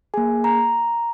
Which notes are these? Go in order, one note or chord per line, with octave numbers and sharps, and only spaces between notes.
A#3 G#4 G#5
A#5